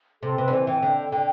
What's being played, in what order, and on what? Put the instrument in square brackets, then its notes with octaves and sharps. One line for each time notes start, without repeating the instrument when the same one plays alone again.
[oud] C3 [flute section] A4
[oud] C3 [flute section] B4
[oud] D3
[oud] E3 [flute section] C5
[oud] E3 [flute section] G5
[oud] D3
D3